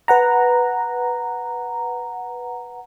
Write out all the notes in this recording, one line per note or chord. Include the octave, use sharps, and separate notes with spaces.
B4 F#5 A#5